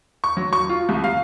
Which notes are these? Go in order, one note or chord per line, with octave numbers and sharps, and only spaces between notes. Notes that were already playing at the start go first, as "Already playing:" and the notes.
C#6
F#3
C#6
F4
C2
F5